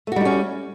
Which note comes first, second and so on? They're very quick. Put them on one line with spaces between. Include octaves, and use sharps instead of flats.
A3 F#4 G3 D#4 C#4